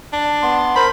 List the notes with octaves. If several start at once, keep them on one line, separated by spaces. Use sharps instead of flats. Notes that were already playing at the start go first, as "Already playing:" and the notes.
D4
B3 C6
A#4 C5 B5